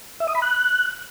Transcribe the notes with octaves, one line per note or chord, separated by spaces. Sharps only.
E5
D#6
B5
F#6